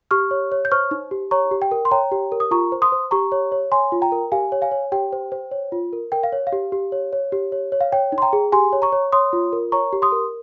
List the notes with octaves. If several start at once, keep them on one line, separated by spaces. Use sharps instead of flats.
G4 C#6 F6
C#5
C#5
G6
C5 C#6 F6
D#4
G4
C#5 A#5 C#6
G4
G5
A#4
C6
C#5 G5 A#5
G4
A#4
D#6
F4 A#5 C#6
C5
C6 D#6
C5
G4 A#5 C#6
C#5
C#5
C#5 G#5 C6
F4
G5 A#5
A#4
G4 F5 G#5
C#5
F5 G#5
C#5
G4 G5
C5
C5
C#5
F4
A#4
A#4 G5
F5
C#5
F5
G4
G4
C#5
C#5
G4
C#5
C#5
F5
C#5 G5
D#4
C6
G5 A#5
G#4
G4 G#5 C6
C#5
A#5 C#6
C#5
C#5 C6 D#6
F4
A#4
C#5 A#5 C#6
G4
C6 D#6
A#4